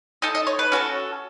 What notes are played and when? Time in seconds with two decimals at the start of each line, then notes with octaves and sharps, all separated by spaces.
0.22 D#4 A4 D#5
0.35 D#5
0.47 C#5
0.59 B4
0.72 C#4 F#4 A4